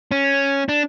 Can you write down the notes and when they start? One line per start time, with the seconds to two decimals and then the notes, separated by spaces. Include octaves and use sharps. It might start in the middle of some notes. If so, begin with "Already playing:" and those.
0.11 C#4
0.69 D4